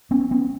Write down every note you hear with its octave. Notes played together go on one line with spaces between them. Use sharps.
B3 C#4
B3 C#4